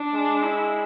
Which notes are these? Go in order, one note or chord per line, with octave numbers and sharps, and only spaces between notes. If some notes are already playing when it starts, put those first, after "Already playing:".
Already playing: D4
G#3
E4